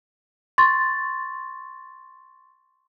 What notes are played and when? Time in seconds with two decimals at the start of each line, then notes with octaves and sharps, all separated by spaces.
0.58 C6 C#6 A6